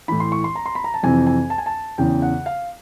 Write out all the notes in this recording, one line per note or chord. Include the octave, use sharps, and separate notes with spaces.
A2 E3 B5
C6
C#6
C6
A#5
C6
B5
A#5
A5
F2 C3 E3 G#5
G#5
A5
G#5
A5
E2 C#3 E3 G5
F#5
F5